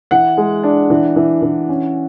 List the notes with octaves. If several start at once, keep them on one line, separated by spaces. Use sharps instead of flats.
E3 F#5
G#3
D4
E3
E3
E3
C#4